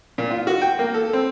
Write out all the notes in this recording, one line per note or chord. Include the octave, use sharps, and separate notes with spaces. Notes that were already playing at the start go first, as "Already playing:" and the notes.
A#2
F4
F#4
G5
A#3
A4
C4